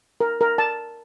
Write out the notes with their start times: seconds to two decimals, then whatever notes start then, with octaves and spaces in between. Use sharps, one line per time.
0.21 A#4
0.41 A#4
0.58 A5